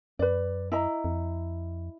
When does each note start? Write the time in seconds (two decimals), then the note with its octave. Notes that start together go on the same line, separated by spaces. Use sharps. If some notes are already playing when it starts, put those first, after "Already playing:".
0.19 F#2 B4 D5
0.72 E4 D#5 A#5
1.04 F2